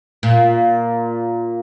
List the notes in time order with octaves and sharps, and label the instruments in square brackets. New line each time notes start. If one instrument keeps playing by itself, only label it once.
[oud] A#2